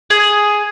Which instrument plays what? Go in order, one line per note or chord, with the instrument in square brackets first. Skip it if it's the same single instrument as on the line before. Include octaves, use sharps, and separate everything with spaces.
[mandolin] G#4